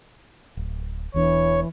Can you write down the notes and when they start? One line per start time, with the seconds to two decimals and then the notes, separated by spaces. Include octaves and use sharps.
0.57 D1
1.14 E1 E2 E3 D4 C#5